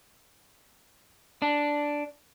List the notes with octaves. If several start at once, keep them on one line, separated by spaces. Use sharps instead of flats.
D4